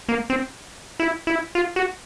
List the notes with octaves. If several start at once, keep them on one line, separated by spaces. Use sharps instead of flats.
A#3
C4
E4
E4
F4
F#4